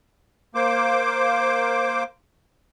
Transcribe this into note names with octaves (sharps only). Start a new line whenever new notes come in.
A#3 C5 D6